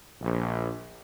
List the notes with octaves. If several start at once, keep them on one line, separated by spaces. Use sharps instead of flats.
A#1